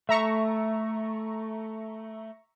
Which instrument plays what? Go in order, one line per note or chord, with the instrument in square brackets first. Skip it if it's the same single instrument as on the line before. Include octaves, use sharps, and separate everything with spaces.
[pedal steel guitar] A3 [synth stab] E5 A#5 C#6